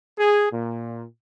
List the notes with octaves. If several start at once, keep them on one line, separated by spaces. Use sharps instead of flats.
G#4
A#2